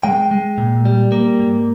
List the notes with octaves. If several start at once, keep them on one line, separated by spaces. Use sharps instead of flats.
G#3 G5
G#3
A#2
G3
A#3
G#2